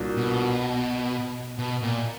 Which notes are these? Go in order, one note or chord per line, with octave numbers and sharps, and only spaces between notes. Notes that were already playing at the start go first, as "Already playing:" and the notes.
Already playing: C2 A#2 F#3 A#3 D4
B2
B2
A#2